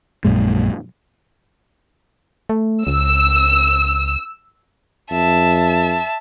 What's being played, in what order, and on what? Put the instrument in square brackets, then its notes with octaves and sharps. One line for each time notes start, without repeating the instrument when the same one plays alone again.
[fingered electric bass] A#1 F#2 A#2 G#3
[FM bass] A3
[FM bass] C#2 [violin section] E6
[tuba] F2 [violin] E5 A5